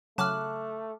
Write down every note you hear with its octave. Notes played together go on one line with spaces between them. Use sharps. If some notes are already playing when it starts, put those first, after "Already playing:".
C#3 F#3 A3 A5 D6 F6 F#6